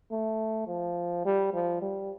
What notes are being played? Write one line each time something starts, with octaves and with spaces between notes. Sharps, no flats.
A3
F3
G3
F3
G3